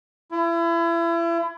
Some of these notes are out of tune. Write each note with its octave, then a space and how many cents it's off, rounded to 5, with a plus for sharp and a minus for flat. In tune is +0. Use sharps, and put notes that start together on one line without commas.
E4 +35